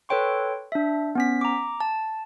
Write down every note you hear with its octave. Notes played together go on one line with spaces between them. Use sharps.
A4 B4 C#5 G5 C6 C#6
D4 E5
B3 C#4 B6
A#5 D6
A5